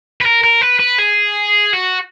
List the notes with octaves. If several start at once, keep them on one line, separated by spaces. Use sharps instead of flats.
B4
A#4
A#4
B4
B4
G#4
F#4